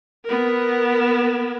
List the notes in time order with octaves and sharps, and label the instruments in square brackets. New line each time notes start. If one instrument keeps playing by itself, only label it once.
[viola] B3 A#4